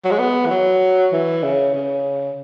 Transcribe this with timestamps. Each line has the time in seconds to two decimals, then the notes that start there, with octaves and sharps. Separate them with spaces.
0.05 F#3
0.11 G#3
0.19 B3
0.46 E3
0.50 F#3
1.12 E3
1.43 C#3
1.74 C#3